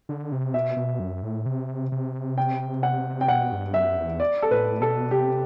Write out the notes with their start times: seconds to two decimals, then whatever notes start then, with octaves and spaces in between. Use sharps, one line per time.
0.09 D3
0.32 C3
0.54 B2 E5
0.77 B2
0.99 F#2
1.23 A2
1.46 C3
1.92 C3
2.38 G5
2.83 F#5
3.21 G5
3.28 B2 F#5
3.52 G2
3.74 F#2 E5
3.97 E2
4.20 D5
4.42 A4
4.51 A2 B4
4.81 B2 A4
5.11 C3 G4